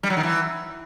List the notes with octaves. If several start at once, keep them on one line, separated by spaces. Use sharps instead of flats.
G3
F#3
D#3
E3